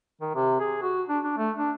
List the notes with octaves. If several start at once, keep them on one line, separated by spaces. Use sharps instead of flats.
D#3
C3
G#4
F#4
D4
D4
A3
D4